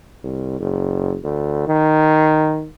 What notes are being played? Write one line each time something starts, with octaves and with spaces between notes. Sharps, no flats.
C2
F#1
D2
D#3